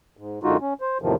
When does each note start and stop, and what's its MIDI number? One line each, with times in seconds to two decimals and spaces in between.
0.17 0.39 44
0.43 0.57 42
0.43 0.57 50
0.43 0.57 56
0.43 0.57 63
0.43 0.57 65
0.43 0.57 66
0.61 0.74 61
0.81 0.98 72
1.02 1.15 40
1.02 1.15 45
1.02 1.15 48
1.02 1.15 51
1.02 1.15 53